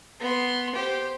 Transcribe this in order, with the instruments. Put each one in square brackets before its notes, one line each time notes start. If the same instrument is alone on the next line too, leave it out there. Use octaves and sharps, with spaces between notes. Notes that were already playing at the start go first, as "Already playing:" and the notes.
[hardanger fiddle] B3 C6
G4 C5